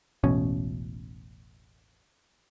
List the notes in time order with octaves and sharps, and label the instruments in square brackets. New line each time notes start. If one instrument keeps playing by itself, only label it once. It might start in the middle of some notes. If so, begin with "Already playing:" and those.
[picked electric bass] E1 A1 B2 C#4